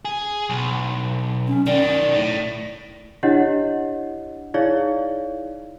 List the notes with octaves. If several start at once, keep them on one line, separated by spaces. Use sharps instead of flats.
G#4
B1
C#4
B1 D#3 D5
A2
D4 E4 G4 C#5 D#5 F#5
D#4 E4 G#4 C#5 D5 F5